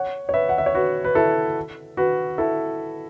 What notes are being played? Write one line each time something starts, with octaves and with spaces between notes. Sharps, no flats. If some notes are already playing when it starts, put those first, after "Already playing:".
Already playing: C#5 F#5
C#5
B4 E5
F#5
E5
C#5
F#4 B4
B4
E4 A4
F#4 B4
E4 A4